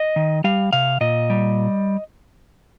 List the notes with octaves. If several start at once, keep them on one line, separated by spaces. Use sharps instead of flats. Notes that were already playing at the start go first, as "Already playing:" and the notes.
Already playing: D#5
D#3
G3 F5
C3 F5
A#2 D#5
G3